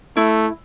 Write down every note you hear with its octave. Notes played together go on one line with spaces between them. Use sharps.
A3 E4